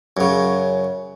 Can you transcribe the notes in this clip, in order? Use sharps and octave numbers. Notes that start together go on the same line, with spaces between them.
F#2 C#3